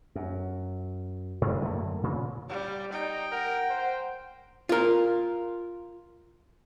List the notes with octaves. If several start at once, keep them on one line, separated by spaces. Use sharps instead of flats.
F#2
G#2 C#3 G3 G#3
F#2 D3 A3 A#3
A#2 C#3
G3
D#4 G5
A#4 F#5
C5
F4 A#4